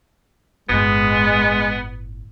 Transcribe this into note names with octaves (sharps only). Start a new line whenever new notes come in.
G1 A2 G#3 B3